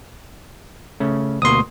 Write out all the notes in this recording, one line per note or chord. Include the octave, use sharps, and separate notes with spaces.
C#3 A3 C#4
D2 B2 A#3 C6 D#6